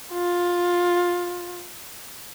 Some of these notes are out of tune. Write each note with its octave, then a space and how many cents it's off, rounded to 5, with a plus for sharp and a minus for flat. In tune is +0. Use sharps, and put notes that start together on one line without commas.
F4 +15